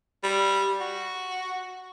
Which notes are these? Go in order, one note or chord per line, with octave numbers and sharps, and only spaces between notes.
G3
F#4